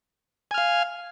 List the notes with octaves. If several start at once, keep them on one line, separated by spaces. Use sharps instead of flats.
F5 G#5 F6